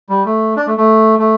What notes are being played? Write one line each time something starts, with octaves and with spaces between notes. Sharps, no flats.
G3
A3
D4
A3
A3
A3